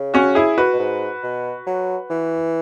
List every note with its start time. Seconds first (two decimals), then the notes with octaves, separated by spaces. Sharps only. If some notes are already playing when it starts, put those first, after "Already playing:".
Already playing: C#3
0.14 C#4 F#4
0.35 E4 G#4
0.58 F#4 B4
0.73 B2
0.79 G#2
1.23 B2
1.67 F#3
2.10 E3